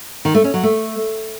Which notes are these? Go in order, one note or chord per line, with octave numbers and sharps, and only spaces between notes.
D#3
A3
C#4
F#3
A3